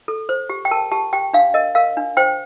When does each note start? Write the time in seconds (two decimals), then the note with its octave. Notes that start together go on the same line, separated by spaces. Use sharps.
0.08 A4
0.29 C5
0.50 G4
0.65 G5
0.71 A#4 A5
0.92 G4 A5
1.13 G4 G5
1.33 D4 F5
1.54 A#4 D#5
1.75 A#4 F5
1.97 D4
2.17 C5 G5